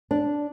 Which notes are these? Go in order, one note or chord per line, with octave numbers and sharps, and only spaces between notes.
D4